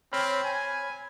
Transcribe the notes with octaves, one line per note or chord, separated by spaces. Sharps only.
C4 C#5 B5 F6
G#5